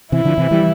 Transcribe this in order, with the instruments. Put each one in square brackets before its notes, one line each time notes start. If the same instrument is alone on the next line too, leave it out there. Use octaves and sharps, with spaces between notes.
[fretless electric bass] C3 E3 [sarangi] E4
[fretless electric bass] D3 F3
C3 E3
E3 G3